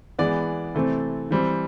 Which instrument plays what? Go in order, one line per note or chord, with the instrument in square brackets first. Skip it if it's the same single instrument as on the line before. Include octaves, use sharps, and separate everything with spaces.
[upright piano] E3 G#3 B3 D5
C3 E3 A3 C4
E3 G3 C4